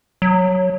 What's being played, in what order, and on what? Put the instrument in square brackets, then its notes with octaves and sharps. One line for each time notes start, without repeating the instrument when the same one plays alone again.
[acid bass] F#3